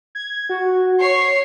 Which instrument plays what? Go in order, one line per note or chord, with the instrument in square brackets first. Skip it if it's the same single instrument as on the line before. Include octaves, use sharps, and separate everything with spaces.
[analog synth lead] G#6
F#4
[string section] C#5 [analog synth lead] C7